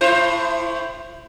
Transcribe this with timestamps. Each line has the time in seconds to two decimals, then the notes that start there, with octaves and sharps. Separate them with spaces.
0.01 A2 E4 C5